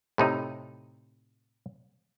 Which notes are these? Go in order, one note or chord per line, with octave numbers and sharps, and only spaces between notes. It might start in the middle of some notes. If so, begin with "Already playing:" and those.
A2 C3 D#4